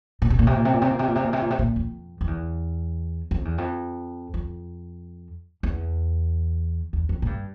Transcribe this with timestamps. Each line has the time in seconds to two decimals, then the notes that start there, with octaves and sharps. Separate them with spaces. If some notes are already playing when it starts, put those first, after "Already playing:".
0.22 A#2
0.30 C3
0.39 A#2
0.47 C3
0.56 A#2
0.65 C3
0.73 A#2
0.82 C3
0.91 A#2
0.99 C3
1.07 A#2
1.15 C3
1.24 A#2
1.33 C3
1.41 A#2
1.50 C3
1.59 A#2
1.76 F2
2.21 F2
2.27 E2
3.31 F2
3.45 E2
3.58 F2
4.34 F2
5.63 E2
6.93 E2
7.09 F2
7.22 A2
7.27 G2